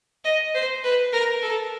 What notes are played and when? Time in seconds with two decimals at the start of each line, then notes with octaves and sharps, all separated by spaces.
0.25 D#5
0.54 C5
0.84 B4
1.13 A#4
1.42 A4